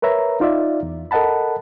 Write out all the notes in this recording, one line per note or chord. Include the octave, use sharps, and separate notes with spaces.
A#4 B4 C#5 E5 A#5
D#4 F4 D5 E5 F5
E2
A4 A#4 D#5 F#5 A5 B5